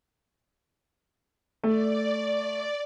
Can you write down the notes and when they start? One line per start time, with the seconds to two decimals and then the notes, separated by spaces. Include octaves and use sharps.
1.64 A3 D5